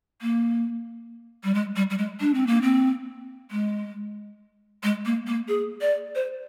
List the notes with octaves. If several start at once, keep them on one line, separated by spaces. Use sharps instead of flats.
A#3
G3
G#3
G3
G3
G#3
D4
C4
A#3
C4
G#3
G#3
A#3
A#3
G#4
D5
C5